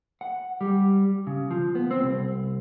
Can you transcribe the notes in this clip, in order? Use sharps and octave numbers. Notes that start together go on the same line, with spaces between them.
F#5
G3
C#3
F3
B3
C4
C2